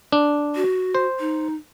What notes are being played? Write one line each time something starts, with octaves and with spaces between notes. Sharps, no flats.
D4
F#4
C5
D#4